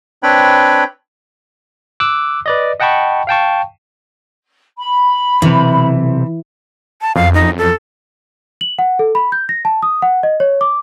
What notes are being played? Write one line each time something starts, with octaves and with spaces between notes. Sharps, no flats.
C4 D4 B4 C#5 G5 B5
D6 E6 F#6
B4 D5 D#5
D#5 F#5 G5 A5 B5 C#6
F5 G5 A5 C#6
B5
B1 C3 E3
A5
F2 F5
D#4
A4
F#7
F#5
A4
B5
G6
A#6
A5
D#6
F#5
D#5
C#5
D6